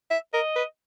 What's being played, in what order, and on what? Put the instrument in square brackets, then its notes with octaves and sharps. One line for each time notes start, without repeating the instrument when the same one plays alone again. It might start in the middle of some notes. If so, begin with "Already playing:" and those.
[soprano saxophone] E5
[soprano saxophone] A#4 [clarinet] D#5
[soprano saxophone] B4